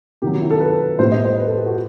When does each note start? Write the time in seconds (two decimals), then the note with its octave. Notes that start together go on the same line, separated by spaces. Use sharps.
0.22 C3 D#3 F#3 G4
0.41 E4
0.51 A4
0.60 B4
0.99 A2 G3 B3 C5
1.12 D#5
1.25 C5
1.38 B4
1.47 A4
1.57 G4
1.66 F#4